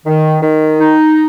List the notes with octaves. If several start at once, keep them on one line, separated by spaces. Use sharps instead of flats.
D#3
D#3
D#4